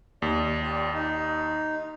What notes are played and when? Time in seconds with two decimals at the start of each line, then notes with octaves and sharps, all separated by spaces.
0.22 D#2 D5
0.62 F4 G4 D5
0.94 D#4